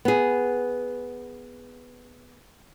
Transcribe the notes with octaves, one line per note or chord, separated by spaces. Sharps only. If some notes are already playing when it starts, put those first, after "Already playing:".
B3 G#4